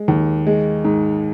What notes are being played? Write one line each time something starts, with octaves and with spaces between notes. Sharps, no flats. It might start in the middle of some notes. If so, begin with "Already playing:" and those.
Already playing: G#3
D#2
G#3
G#2